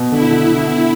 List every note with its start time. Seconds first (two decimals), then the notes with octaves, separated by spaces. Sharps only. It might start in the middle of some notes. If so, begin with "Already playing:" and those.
Already playing: B2
0.12 D3 E4
0.31 D3
0.48 D3
0.66 B3